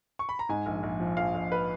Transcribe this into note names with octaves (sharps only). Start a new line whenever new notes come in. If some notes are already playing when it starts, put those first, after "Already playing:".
C#6
B5
A#5
G#2 G#5
A#1
A#1
F3
A#1 F5
A#1
B4